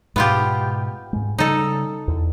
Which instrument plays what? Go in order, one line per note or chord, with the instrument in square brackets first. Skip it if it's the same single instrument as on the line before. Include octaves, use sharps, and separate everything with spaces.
[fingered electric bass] G#2 B2 [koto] B3 F4 G4
[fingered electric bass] G#2 G#3
[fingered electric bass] C#3 G3 [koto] D#4 A4
[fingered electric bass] E2